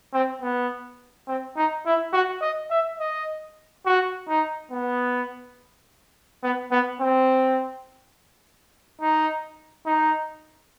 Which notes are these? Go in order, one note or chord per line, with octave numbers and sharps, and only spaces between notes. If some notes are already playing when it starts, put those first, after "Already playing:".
C4
B3
C4
D#4
E4
F#4
D#5
E5
D#5
F#4
D#4
B3
B3
B3
C4
D#4
D#4